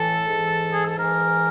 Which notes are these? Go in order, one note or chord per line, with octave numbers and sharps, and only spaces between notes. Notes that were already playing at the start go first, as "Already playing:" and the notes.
Already playing: A2 E3 A4
G#2 E3
G#4
A4
G#2 E3 A#4